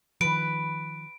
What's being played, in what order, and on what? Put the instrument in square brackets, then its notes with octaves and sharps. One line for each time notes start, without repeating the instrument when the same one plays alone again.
[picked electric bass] D#3 F3 [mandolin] B4 [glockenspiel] D7